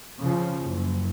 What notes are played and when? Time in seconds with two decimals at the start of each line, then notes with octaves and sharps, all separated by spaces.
0.20 C#3 F3
0.63 F#1